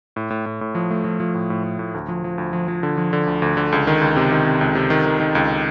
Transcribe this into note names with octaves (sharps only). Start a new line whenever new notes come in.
A2
A2
A2
A2
F3
A3
F3
F3
A2
A2
A2
A2
D2
F3
F3
D2
F3
F3
D3
F3
D3
D2
D2
D3
C#2
D#3
C#2
C3
D#3
C3
C#2
C3
D#3
D#3
D#3
C#2